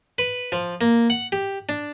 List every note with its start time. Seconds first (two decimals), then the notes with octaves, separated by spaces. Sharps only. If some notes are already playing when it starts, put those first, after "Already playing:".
0.18 B4
0.52 F3
0.81 A#3
1.10 F#5
1.32 G4
1.69 D4